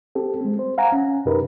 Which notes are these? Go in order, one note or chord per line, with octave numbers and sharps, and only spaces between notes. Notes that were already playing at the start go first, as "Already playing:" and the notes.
C4 G4 A4
G#3 C4
C5
F5 F#5 G#5 A#5
C#4
F#2 C3 D#4 G4 A#4 B4